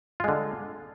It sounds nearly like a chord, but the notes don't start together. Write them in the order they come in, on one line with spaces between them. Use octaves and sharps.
F4 G#3 D3